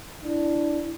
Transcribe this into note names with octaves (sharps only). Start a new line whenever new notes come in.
D4 E4